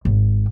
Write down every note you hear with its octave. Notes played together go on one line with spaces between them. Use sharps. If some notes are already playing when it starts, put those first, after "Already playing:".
G#1